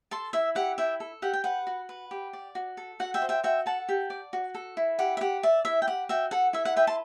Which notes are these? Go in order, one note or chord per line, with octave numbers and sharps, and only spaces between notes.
A4 A5 C6
E4 E5
G4 F#5
E4 E5 G5
A4
G4 F#5
G5
B4 F#5
F#4
B4
G4
D5
F#4
A4
F#4 F#5
E5 G5
C5
E5 G5
F#4 E5 G5
A4 F#5 A5
G4
D5
F#4
A4
E4
G4 F#5
E5
G4 F#5
D5 E5
E4 E5
G5
G4 F#5
F#4 E5 G5
A4 F#5
E4 E5
F#5
B4 E5 G5
A5 C6